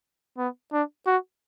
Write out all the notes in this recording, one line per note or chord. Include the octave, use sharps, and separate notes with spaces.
B3
D4
F#4